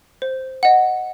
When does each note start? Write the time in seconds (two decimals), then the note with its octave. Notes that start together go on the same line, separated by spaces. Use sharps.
0.22 C5
0.63 D#5 F#5